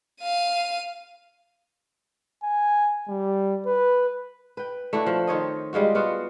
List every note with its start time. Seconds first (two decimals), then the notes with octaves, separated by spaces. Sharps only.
0.21 F5 D#7
2.43 G#5
3.08 G3
3.66 B4
4.57 B4 G5
4.93 A3 D4 E4 F#4
5.06 F3
5.27 D#3 C4 C#5 D#5
5.73 G3 G#3 F4 F#4
5.95 B3 F4 F#4